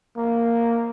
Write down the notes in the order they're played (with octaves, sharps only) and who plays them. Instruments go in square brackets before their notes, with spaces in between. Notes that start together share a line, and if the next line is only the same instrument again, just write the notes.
[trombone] A#3